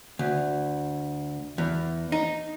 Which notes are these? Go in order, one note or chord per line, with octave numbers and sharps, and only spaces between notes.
D2
E2
D#4